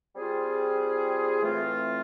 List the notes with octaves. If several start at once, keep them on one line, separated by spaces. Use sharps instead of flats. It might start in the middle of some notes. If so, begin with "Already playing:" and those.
G3 C4 F4 G#4
A2 E3 A3 C4 F4